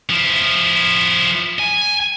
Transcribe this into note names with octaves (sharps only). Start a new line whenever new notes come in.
F3 E4
G#5